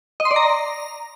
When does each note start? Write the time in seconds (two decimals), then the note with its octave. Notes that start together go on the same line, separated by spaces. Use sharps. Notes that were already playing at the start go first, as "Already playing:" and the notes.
0.20 D#5
0.25 C6
0.31 D5
0.36 A#5